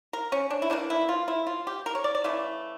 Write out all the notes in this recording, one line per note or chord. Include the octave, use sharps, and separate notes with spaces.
A#4
C#4
D4
E4
C#3 E3 A#3 D4
E4
F4
E4
F4
G4
A#4
C#5
D5
D5
C#3 E3 A3 E5